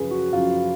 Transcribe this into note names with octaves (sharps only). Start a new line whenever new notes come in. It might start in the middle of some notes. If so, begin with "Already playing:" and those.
Already playing: F#2 C#3 F3 G#4 B4
F#4
F#2 C#3 F3 F4